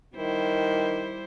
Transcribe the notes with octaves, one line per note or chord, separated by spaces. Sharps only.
D#3 G3 E4 C5